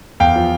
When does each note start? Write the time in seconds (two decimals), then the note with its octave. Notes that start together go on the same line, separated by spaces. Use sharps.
0.20 E2 F5 G5
0.36 F3